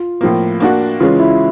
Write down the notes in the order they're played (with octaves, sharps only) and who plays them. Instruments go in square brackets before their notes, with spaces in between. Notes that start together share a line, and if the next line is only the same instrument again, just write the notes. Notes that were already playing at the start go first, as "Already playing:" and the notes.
Already playing: [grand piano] F4
[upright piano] A2 F3 A#3
A#3 D4 F#4
[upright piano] C#3 E3 G#3 C#4 [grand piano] F4
[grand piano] E4